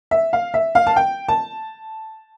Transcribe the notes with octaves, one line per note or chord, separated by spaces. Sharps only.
E5
F5
E5
F5
A5
G5
A5